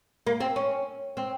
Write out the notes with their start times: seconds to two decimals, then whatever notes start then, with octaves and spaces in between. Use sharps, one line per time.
0.27 A#3
0.40 C4
0.56 C#4
1.17 C4